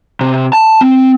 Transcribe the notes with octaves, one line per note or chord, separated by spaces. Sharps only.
C3
A5
C4